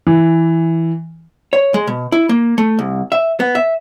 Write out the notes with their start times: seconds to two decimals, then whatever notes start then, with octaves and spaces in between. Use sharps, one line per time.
0.07 E3
1.53 C#5
1.74 G#3
1.87 B2
2.12 E4
2.29 A#3
2.58 A3
2.79 C2
3.12 E5
3.40 B3
3.55 E5